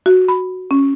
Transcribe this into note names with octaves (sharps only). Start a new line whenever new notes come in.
F#4
B5
C#4